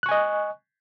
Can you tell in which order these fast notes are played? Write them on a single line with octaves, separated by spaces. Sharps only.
F#6 C#6 G#5 D#5